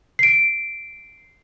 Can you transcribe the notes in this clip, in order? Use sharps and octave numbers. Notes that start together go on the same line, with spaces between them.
C7 D7